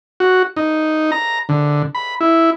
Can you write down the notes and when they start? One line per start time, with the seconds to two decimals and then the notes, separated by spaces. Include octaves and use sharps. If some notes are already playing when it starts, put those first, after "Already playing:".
0.20 F#4
0.57 D#4
1.12 A#5
1.49 D3
1.95 B5
2.21 E4